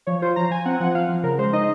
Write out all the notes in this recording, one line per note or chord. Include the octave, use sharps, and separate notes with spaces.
F3 C#5
F4 C5
F3 A#5
F3 G#5
C4 F#5
F3 F#5
F3 F5
F3
C#3 A#4
G#3 C5
D#4 D#5